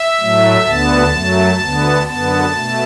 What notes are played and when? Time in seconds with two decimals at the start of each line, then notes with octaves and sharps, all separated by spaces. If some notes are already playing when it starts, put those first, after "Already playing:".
Already playing: E5
0.20 A2 F#3 A3
0.66 D2 D3 B3 A5
1.13 F#2 F#3 A3
1.60 D2 D3 B3
2.07 F#2 D3 B3 A5
2.54 B2 A3